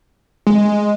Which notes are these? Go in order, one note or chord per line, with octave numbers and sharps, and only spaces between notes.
G#3